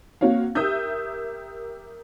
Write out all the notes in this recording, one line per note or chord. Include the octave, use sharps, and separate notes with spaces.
A#3 C4 F#4 C#5 F5
G4 A#4 E5 D#6 E6 G6